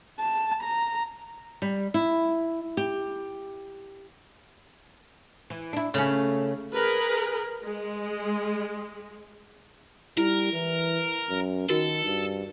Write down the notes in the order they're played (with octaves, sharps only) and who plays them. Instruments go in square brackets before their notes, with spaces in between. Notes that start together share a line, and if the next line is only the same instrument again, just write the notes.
[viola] A5
A#5
[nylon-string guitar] G3
E4
G4
[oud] E3
D4 E4
[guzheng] C#3 [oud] A3 C#4
[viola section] G#4 A#4 B4
G#3
[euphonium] G3 [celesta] E4 [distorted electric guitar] A#4
[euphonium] E3
F#2
[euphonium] D#3 [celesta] F#4 A#4 [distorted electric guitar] A4
[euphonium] G2